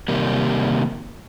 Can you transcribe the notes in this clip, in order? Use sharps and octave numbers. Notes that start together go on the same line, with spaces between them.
C3 D#3 G3 A#3